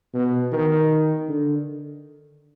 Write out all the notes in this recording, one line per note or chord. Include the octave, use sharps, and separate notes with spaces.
B2
D#3
D3